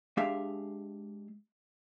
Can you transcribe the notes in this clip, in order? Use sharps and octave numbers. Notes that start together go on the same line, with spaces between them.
G#3 D4 G4 E5 F5